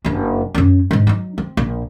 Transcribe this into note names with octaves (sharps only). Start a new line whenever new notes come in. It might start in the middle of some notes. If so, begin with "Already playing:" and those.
F#1 D4
F#2 C#4
G#2 D#4
F#3 D#4
C4
A#1